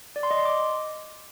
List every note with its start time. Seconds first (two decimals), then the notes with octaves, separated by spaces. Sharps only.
0.16 D5
0.23 C6
0.31 D#5
0.38 C6
0.45 D6